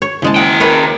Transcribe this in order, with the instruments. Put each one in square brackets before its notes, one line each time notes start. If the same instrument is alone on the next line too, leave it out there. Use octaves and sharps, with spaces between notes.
[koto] C#5
[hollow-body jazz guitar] D#2 E4 C5 [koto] C#3 G#3 A5
[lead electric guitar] C#3 G5 [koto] F#5
[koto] A#4 B4 C#5